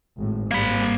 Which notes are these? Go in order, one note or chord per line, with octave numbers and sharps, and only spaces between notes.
G#1 A2
G#1 G2 G3 A#3 B5